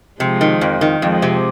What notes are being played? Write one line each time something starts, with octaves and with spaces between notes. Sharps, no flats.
C3 F3 G#3
D#3
F2
D#3
F2 F3 G#3
C3